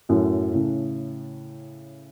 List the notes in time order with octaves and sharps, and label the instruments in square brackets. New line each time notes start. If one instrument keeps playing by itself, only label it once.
[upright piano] F#2 A2
A2 C#3